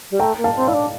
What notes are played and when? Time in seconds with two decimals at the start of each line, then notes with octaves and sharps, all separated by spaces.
0.11 G3
0.19 A3 G5 A#5
0.38 A#3
0.44 F5 A5
0.56 C4
0.68 E4 D5 F5
0.74 D4